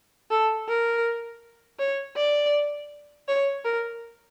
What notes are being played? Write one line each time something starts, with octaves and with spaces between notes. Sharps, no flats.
A4
A#4
C#5
D5
C#5
A#4